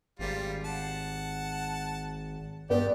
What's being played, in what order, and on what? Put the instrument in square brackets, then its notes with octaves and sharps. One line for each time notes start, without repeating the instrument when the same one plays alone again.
[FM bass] G#1 [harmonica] G3 F4
[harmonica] F#5 A5
[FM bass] G2 [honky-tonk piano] B3 [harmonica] G4 [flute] D5